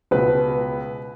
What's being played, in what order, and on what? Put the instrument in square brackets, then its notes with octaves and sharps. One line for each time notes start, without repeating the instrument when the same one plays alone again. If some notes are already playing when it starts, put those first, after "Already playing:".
[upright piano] C#2 B2 B4